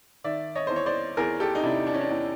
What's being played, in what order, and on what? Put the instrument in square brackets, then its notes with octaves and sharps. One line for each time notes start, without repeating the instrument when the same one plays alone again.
[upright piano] D#3 D5 E5
C#5 D#5
E2 C5
C#5
C5 D5
E2 G#4 A#4
G4 A4
D#4
C3 D4 E4
D4
C#4
D4
E2